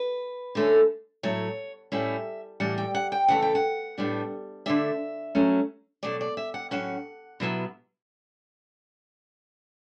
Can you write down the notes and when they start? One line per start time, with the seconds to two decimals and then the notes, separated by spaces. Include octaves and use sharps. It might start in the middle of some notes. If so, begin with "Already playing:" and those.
Already playing: B4
0.55 D3 A3 C#4
1.23 A2 F#3 A3 E4 C#5
1.92 A2 G3 C#4 E4 E5
2.60 A2 E3 G3 F#5
2.78 G5
2.95 F#5
3.12 G5
3.28 C#3 E3 A3 F#5
3.42 G5
3.55 F#5
3.98 A2 G3 B3 D4
4.66 D3 A3 D4 E5
5.35 F#3 A3 C#4
6.03 B2 F#3 A3 D5
6.21 D5
6.37 E5
6.54 F#5
6.71 A2 F#3 C#4 F#5
7.40 B2 F#3 B3 E4